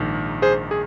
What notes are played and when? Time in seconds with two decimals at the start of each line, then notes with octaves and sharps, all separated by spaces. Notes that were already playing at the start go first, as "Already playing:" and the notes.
Already playing: A#1 G#2 D#3
0.42 G#4 C5
0.71 G#4